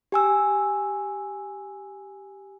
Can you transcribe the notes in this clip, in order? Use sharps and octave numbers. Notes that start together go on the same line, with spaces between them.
G4 G#5 E6